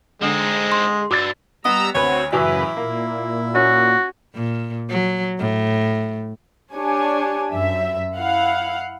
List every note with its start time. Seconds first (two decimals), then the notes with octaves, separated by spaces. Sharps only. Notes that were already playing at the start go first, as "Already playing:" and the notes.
0.22 D3 G#3 C4 D#4
0.72 C6
1.11 G2 F#4 D6 E6 A6
1.65 G3 B3 D#5 A#5 E6
1.95 D2 C4 F#4 B4 C#5
2.32 F#2 A2 C#3 E3 F#3 E4 B4
2.77 A#2 A#3
3.55 C#4 F#4
4.35 A#2
4.90 F#3
5.39 A2
6.74 D4 G4 C#5 G#5
7.53 F#2 E5
8.17 E4 F5 F#5